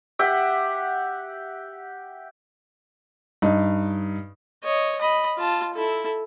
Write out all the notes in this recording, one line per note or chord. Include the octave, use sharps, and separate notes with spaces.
G4 E5 F#5
G2 D#4
C#5 D#5
D#5 B5
F4 A5
E4 A4